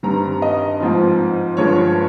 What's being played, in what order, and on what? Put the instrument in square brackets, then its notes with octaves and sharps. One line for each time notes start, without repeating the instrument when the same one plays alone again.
[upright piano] G2 D#3 G3 C4 A#5
D#5
G#2 F3 C4
G2 F3 G#3 C#5